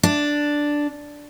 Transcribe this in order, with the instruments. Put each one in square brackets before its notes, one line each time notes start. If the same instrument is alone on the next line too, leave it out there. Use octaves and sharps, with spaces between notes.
[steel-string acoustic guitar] D4